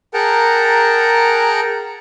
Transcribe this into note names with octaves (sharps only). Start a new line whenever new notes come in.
G#4 A#4 F#5 G5 A5 A#5